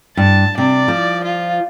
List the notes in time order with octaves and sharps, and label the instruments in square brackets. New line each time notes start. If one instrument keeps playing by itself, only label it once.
[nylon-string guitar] G2 [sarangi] A5
[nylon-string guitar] C3 [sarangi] D5
[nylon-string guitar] F3
[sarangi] F4